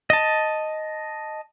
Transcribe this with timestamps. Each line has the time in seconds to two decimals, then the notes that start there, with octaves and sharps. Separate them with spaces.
0.10 D#5 A5